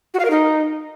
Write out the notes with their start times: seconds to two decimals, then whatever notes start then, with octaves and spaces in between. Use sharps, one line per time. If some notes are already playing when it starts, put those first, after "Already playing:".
0.14 F#4
0.20 F5
0.25 A#4
0.30 D#4